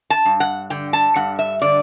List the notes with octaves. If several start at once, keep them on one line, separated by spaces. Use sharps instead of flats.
A5
G2
F#5
D3 G5
A5
G2 F#5
E5
D3 D5